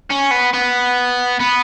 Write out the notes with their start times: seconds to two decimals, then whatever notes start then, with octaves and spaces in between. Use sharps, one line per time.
0.10 C#4
0.31 B3
0.53 B3
1.40 B3